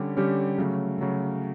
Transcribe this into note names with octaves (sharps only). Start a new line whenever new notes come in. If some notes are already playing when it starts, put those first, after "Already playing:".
Already playing: D3 G3 C#4 G4
D3 G3 C#4 G4
C#3 F#3 A3
C#3 F#3 A3